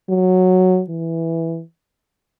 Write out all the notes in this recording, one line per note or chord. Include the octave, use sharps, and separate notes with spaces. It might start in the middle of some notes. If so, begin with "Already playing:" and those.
F#3
E3